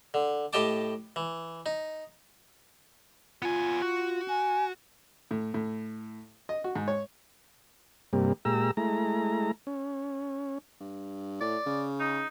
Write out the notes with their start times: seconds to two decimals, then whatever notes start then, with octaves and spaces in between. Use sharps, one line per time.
0.14 D3
0.53 A2 G4 D#5 G5 A5 D6
1.16 E3
1.66 D#4
3.42 B3 F4 G#5
3.82 F#4
4.28 G#5
5.31 A2
5.54 A2
6.49 D#5
6.64 F#4
6.76 G#2
6.88 C#5
8.13 G2 C3 G3 A#3
8.45 A#2 G#3 G4 A#5 E6
8.77 G#3 A3 E4 A#5
9.67 C#4
10.80 G2
11.41 A2 D5
11.66 C#3
12.00 D#4